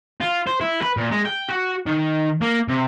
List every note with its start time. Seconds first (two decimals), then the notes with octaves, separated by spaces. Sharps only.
0.21 F4
0.47 C5
0.61 E4
0.82 B4
0.97 A#2
1.11 G#3
1.25 G5
1.49 F#4
1.86 D#3
2.42 A#3
2.69 C3